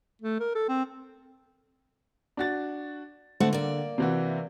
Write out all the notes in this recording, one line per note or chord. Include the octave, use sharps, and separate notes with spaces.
A3
A#4
A4
C4
D4 F#4 A6
D3 A3 C4 F#5
A#3 D5
C3 E3 F#4